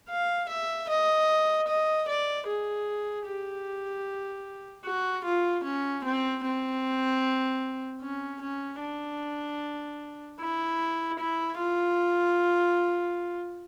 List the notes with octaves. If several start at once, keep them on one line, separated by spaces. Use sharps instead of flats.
F5
E5
D#5
D#5
D5
G#4
G4
F#4
F4
C#4
C4
C4
C#4
C#4
D4
E4
E4
F4